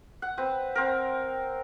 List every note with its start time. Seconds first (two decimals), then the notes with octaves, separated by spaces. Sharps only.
0.22 F#5
0.38 C4 B4
0.75 C4 A#4